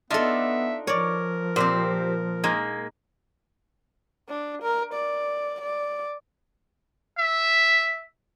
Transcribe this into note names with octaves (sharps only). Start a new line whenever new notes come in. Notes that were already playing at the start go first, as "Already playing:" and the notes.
B3 D4 D#4 F4 A4 E5
F3 A#4 C#5 D5
A#2 C4 G4 C5
G#3 A#3 D#4
D4
A#4
D5
D5
E5